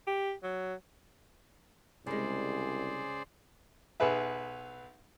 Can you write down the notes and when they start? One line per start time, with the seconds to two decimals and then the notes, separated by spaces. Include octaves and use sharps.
0.07 G4
0.43 F#3
2.06 C2 C#3 G#3 G#4 C5 D5
4.00 B1 G#4 B4 E5